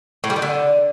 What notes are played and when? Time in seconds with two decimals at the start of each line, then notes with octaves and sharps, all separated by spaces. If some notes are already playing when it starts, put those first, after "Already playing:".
0.24 A2
0.30 G3
0.36 D#3
0.42 D3